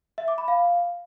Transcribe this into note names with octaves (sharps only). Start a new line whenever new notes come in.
E5
D6
B5
F5